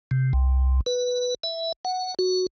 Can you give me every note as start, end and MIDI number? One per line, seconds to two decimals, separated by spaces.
0.11 0.33 48
0.33 0.81 36
0.86 1.35 71
1.43 1.72 76
1.85 2.14 78
2.19 2.47 66